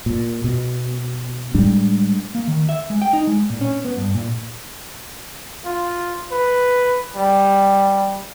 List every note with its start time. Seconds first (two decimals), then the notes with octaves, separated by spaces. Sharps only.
0.06 A#2
0.44 B2
1.54 A2 G3 G#3 D4
2.35 A#3
2.48 D#3
2.69 E5
2.90 G#3
3.02 G5
3.13 D#4
3.27 G#3
3.50 A#2
3.61 C#4
3.85 B3
3.97 G2
4.14 A#2
5.65 F4
6.32 B4
7.16 G3